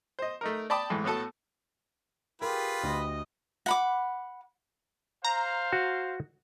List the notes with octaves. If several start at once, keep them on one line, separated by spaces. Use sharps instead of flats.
C5 D#5
A3 D#4 A#4
D5 G5 A5 B5 D6 D#6
G#2 E3 A3
A2 B3 F#4 A4 A5
F4 G4 G#4 A#4 B4
D2 D#5
F#5 B5 D6
C5 F5 A#5
F#4